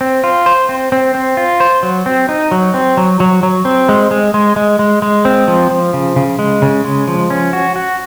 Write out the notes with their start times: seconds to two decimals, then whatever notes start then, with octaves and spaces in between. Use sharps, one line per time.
0.01 C4
0.24 F4
0.46 C5
0.69 C4
0.92 C4
1.15 C4
1.37 F4
1.60 C5
1.83 F#3
2.06 C4
2.29 D#4
2.51 F#3
2.74 C4
2.97 F#3
3.20 F#3
3.43 F#3
3.65 C4
3.89 G#3
4.11 G#3
4.34 G#3
4.56 G#3
4.79 G#3
5.02 G#3
5.25 C4
5.48 F3
5.71 F3
5.93 C#3
6.16 C#3
6.39 G#3
6.62 C#3
6.85 G#3
7.08 F3
7.30 C#4
7.53 F#4
7.76 F#4